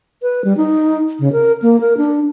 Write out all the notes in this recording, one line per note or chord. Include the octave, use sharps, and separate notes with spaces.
B4
G3
D#4
C#3
A#4
A#3
A#4
D4